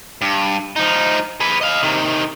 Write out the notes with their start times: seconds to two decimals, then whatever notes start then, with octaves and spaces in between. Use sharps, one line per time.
0.22 G2
0.76 F3 D#4
1.40 G#4 B4
1.61 D#5 F5
1.82 C3 D#3